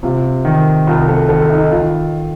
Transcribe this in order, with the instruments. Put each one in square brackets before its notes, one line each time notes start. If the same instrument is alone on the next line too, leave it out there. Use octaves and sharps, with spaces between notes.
[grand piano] C3 [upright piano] F4
[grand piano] D#3
[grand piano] C2 [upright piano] F4
[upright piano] A4
[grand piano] D#3 [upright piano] A4
[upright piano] D#4
[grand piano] D#3 [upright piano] F4